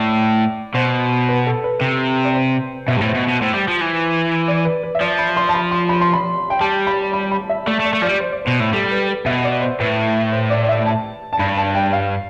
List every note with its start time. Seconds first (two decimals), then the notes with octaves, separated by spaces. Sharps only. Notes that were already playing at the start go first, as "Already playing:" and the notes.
Already playing: A2 D5
0.75 B2 C5
1.29 B4
1.47 A4
1.64 B4
1.82 C3
2.24 D5
2.35 C5
2.88 B2 E5
2.97 G2
3.01 A2
3.06 C5
3.15 B2
3.28 B2
3.41 A2 C5
3.54 G3
3.68 F3
3.81 E3
4.48 D5
4.65 B4
4.83 B4
4.95 E5
5.01 F3 D5
5.19 B5
5.37 C6
5.49 A5
5.55 B5
5.71 C6
5.89 B5
6.01 C6
6.13 B5
6.50 G5
6.60 G3 A5
6.87 B5
7.13 B5
7.32 B5
7.49 E5
7.67 A3 D5
7.80 A3
7.85 D5
7.93 A3
8.02 F3 G3 D5
8.20 C5
8.32 D5
8.45 B2 C5
8.60 A2
8.73 G3 A4
8.91 B4
9.08 B4
9.26 B2 E5
9.44 D5
9.61 C5
9.80 A2 B4
10.33 C5
10.50 D5
10.62 D5
10.69 E5
10.86 A5
11.33 A5
11.39 G2 B5
11.57 A5
11.75 G5
11.93 F5